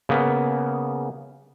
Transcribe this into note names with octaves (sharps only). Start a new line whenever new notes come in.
C#3 A#3 B3